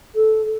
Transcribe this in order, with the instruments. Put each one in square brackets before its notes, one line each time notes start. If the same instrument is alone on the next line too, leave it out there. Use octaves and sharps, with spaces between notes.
[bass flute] A4